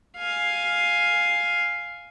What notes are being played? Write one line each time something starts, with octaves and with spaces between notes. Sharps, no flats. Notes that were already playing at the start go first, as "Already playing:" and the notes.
F5 G#5